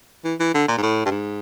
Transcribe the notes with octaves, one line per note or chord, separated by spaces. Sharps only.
E3
E3
D3
A#2
G#2
A2
G2
G#2